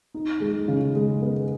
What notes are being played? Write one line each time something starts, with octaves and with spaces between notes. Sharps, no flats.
D#4
G#3
C#3
G#3
B3